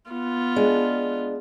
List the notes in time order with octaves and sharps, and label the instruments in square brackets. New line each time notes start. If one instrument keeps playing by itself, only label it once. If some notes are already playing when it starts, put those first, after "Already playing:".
[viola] B3 F4
[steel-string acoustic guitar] G#3 D4